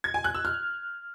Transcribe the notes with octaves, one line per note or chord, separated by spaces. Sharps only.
G#6
G#5
F#6
E6
F6